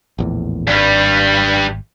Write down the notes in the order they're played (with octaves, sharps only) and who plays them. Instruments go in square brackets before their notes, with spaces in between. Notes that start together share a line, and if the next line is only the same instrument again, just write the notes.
[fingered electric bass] A#1 E2 A2
[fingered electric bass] G#1 [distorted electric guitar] G2 G3